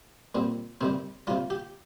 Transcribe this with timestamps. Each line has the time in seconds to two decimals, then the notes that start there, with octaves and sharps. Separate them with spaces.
0.35 A#2 G3 C4
0.81 C3 D#3 G3 C4
1.27 C3 G3 F4
1.50 G4